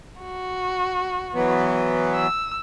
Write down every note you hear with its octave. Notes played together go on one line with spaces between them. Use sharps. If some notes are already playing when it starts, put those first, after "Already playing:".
F#4
E3 F#3 B3
E6